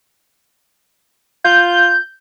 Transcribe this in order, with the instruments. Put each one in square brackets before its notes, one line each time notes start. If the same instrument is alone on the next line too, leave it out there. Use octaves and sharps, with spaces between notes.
[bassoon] F4 [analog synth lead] G6